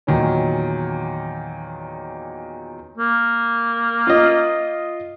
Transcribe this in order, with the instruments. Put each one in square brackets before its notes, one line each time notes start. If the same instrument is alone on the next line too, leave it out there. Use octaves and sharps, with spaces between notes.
[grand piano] E2 A#2 D#3 F#3 C#4
[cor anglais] A#3
[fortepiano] F4 D#5